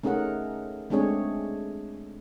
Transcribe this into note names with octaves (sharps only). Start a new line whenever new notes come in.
A3 C#4 D#4 G#4 A#4 F#5
G#3 A3 C4 D4 G#4 C#5